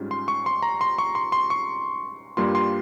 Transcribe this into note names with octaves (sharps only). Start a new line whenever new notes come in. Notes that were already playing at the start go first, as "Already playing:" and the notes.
Already playing: G#2 G3 C#4 F4
C6
C#6
C6
A#5
C6
C#6
C6
C6
C#6
G2 G3 A#3 F4 C6
C6